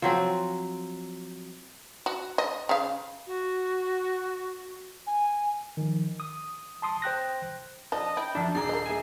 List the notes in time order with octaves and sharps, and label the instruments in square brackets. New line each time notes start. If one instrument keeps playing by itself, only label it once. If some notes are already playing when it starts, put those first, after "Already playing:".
[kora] F3 F#3 C4
[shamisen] F#4
D#5
C#3 F5
[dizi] F#4
G#5
[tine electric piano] D#3 F3
D#6
A5 C6 D#6
C5 G5 F#6 A#6
[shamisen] F3 D4 [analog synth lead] D#5 [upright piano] A5
[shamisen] E4 [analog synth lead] G5
[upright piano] F#2 [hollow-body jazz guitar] F3 E5 [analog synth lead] D4
[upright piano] D#1 A#5 [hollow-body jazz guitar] D4 G#4 [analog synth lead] C7
[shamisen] A#4 D#5
[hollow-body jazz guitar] G#4 E5 G#5